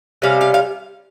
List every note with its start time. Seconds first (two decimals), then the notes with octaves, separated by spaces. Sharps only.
0.22 C3 G3 C#4 F5
0.41 F5
0.54 F5